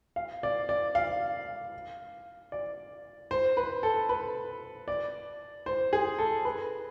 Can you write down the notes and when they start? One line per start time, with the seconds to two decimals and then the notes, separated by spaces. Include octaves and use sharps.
0.16 F5
0.43 D5
0.69 D5
0.95 F5
2.52 D5
3.31 C5
3.57 B4
3.83 A4
4.09 B4
4.88 D5
5.66 C5
5.93 G#4
6.19 A4
6.45 B4